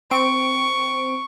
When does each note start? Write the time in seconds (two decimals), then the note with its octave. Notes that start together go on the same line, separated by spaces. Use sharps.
0.11 C4 C#6 D7